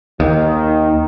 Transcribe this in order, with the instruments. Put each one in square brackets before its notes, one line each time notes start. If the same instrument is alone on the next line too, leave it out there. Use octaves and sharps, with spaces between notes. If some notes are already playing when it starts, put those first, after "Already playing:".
[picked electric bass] D#2 [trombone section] D#3